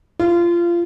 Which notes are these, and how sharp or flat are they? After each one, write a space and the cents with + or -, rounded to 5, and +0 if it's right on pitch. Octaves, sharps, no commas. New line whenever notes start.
F4 -25